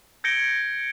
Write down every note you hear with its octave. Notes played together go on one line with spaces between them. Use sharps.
G6 G#6 A#6 C#7 D7 G7